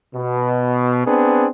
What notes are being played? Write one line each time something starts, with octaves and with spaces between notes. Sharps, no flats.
B2
B3 C4 D4 G#4